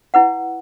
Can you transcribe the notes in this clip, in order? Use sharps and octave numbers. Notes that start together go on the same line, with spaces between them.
E4 B4 F#5